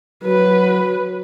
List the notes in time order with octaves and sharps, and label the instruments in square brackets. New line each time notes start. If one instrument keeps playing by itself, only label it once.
[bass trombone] F#3 [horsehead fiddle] B4